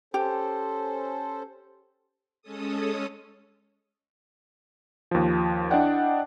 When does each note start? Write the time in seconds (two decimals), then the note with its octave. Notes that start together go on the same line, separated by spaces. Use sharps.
0.14 C#4 G4 A4 C5
2.42 G#3 C#4 A4 D#6
5.11 D#2 F3
5.70 D4 E4 D5 D#5 F#5 G5